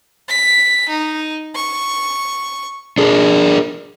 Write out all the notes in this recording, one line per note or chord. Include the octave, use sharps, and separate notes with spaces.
B6
D#4
C#6
D4 G#4 A#4